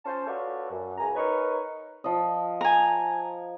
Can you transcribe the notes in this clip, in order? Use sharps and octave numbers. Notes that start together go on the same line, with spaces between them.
C#4 F4 C5 A5
F4 F#4 A4 B4 C#5 D5
F#2
C#2 G#5 A#5
D#4 A#4 B4 C#5
F3 D#5
G#5 A#5